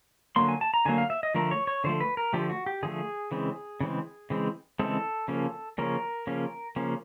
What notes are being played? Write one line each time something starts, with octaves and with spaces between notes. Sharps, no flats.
D3 F#3 A#3 C6
G#5
A5
A#5
D3 F#3 A#3 G#5
F5
E5
D#5
D3 F3 A3 A#4
C#5
C#5
D3 F3 A3 C5
B4
A#4
D3 F3 A3 G4
F#4
G4
D3 F3 A3 G#4
C#3 E3 G#3 C4
C#3 E3 G#3 C4
C#3 E3 G#3 C4
C#3 E3 G#3 C4 A4
C#3 F3 A#3 C#4
C#3 F3 A#3 C#4 A#4
C#3 F3 A#3 C#4
C#3 F3 A#3 C#4